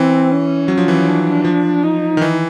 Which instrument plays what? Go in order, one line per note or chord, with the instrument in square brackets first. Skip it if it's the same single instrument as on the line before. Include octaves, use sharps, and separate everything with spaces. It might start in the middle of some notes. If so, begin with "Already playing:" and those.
Already playing: [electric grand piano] E3 [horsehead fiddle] C4
[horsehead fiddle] C#4
[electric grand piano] F#3
F3
E3
F3
[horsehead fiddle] D4
[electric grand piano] F3
[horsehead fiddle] D#4
[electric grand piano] D#3
E3